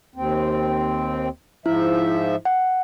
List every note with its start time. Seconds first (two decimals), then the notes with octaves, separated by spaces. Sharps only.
0.16 D#2 C4
1.66 G#2 F3 E4 E5
2.45 F#5